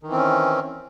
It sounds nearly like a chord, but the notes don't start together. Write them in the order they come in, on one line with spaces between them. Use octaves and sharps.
D#3 E3 C4 C#4